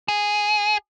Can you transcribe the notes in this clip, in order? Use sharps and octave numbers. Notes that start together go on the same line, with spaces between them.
G#4